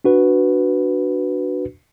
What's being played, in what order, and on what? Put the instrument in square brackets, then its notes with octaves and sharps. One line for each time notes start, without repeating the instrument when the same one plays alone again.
[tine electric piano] D4 F#4 B4